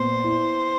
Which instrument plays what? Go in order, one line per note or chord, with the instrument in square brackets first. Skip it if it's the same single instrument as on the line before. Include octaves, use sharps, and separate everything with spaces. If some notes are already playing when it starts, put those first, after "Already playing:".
Already playing: [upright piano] A#2 B3 [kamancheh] C5
[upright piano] E4